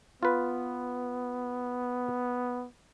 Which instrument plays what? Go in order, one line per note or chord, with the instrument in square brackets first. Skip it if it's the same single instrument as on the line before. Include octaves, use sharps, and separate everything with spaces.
[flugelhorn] B3 [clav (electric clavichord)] F4 B4